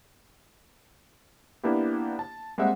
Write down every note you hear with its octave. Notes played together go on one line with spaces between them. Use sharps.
A#3 B3 D4 E4 G4
A5
G3 G#3 A#3 C4 E5 F#5